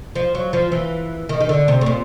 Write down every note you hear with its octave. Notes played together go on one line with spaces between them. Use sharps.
F3
F#3
F3
E3
D#3
D#3
D3
C3
A2
A#2